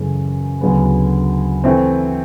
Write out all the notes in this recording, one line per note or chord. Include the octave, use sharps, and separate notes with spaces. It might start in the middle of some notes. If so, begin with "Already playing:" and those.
Already playing: F#2 C#3 E3 A3 C#4
D2 C#3 F#3 B3
E3 A3 C4